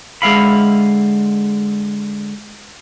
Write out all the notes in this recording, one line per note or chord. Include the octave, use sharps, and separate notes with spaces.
D3 G#3 E5 F5 B5